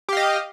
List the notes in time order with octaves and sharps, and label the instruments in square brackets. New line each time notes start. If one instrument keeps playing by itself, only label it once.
[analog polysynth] G4
F5
D#5